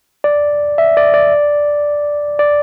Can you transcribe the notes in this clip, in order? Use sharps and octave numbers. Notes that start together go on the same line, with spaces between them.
D5
E5
D5
D5
D5